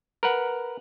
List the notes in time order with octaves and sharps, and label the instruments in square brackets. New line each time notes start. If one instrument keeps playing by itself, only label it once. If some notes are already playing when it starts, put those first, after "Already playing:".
[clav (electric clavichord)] A#4 B4 F#5